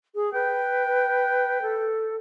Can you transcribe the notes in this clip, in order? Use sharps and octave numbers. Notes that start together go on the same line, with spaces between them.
G#4
B4 G5
A4